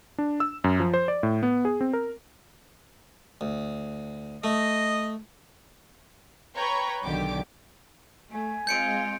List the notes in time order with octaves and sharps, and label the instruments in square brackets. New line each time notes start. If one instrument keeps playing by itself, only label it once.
[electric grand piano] D4
E6
F#2
F3
C5
D5
A2
B3
G#4
C4
A#4
[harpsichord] D2
[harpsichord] A3 [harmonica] D#5
[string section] B4 C#5 G5 A#5 B5 C#6
B1 D3 D#3 G4 D6
[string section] A3 [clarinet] G#5
[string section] G#3 C4 F4 [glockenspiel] G6 C#7 D7